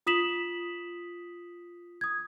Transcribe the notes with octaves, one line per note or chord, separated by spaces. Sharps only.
F4 D#6 B6 E7 F#7
D#6 G#6